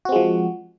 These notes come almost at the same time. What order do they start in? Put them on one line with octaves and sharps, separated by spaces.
F#4 C4 G#3 F3